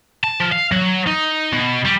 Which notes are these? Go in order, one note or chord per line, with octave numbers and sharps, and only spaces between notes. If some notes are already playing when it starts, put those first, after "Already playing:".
A5
F3
F5
F#3
D#4
B2
G3